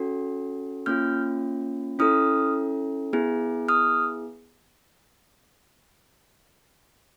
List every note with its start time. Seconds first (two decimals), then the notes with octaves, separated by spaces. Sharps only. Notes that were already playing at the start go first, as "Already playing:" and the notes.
Already playing: C#4 F#4 A4
0.86 A#3 C#4 F4 F6 G6
1.99 C#4 E4 A4 D#6 F6
3.13 B3 E4 G#4
3.68 D#6 F6